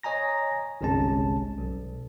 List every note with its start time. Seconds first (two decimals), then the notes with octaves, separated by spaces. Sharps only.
0.03 C#5 D#5 G#5 A#5 A#6
0.81 G1 C2 C3 G#3 C#4 A5
1.58 B1